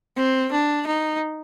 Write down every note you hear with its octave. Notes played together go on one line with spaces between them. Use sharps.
C4
D4
D#4